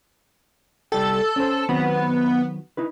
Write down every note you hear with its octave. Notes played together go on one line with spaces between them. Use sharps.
C2 G3 A4 G5
C#4 C5
D#3 F#3 B3 C4
D#4 E4 B4